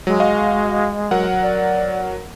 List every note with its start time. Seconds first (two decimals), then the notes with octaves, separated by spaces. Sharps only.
0.07 F#3 G#3
0.20 F#4 D#5 F5
1.11 F#3 A#4 F#5
1.42 D5